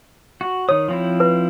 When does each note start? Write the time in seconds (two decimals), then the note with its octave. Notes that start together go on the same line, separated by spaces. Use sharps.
0.41 F#4
0.69 D#3 C#5 D#6
0.88 F3 C4 E4
1.20 B4